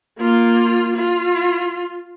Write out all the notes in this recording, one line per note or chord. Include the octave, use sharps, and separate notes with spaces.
A#3 F4
F4